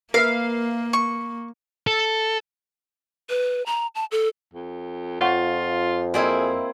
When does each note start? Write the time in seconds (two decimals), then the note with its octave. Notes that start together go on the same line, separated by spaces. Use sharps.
0.14 A#3 A#4 B4 E5 F5
0.93 C#6
1.87 A4
3.30 B4
3.66 A#5
3.95 A5
4.11 A4
4.54 F2
5.21 F2 F4 C#5 F#5 C#6
6.14 A#3 C4 E4 F#4 G#4 D5 D#5